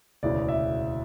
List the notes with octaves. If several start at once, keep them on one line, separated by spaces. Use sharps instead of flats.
E1 D2 C#3 E3 D5
E5